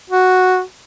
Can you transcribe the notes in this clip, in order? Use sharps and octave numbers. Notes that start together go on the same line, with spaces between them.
F#4